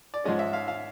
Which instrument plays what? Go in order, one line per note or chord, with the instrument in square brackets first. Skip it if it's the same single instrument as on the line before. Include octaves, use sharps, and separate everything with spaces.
[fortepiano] D5
G#2 F3 G#3 C#4 D#5
E5
F5
F5